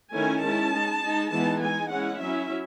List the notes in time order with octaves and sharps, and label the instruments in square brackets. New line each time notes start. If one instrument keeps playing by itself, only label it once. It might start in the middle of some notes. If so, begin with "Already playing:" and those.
[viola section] D#3 A3 C#4 E4 G#5
G#3 C#4 E4 A5
G#3 D#4
G#3 D#4
E3 G#3 B3 D#4 A5
G#3 D#4 G#5
G#3 C#4 E4 F#5
F#3 C#4 E4 E5